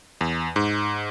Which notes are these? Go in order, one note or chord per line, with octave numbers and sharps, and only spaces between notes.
E2
G#2